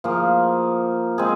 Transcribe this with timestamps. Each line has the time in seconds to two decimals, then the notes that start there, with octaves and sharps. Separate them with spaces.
0.04 F3 A#3 G#4
1.18 G#3 C4 G#4